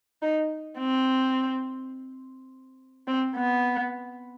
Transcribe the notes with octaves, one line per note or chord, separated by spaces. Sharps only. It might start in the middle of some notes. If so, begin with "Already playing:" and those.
D#4
C4
C4
B3